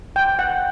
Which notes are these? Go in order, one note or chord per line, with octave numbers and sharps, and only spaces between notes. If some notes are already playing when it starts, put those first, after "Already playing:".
G5
F#5